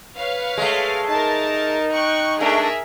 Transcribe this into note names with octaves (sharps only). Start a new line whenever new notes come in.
B4 C#5 F5
G#3 A3
D#4 A#4 A5
G5 C#6 F#6
G#3 A3 D4 G#4 A#4 E5